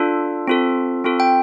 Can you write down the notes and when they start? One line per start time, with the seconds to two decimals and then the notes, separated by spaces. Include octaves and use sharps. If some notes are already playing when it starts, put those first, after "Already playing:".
Already playing: D4 F4 A4
0.47 C4 F4 A4
1.04 C4 F4 A4
1.20 G5